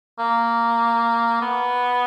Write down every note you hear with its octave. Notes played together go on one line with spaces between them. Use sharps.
A#3
B3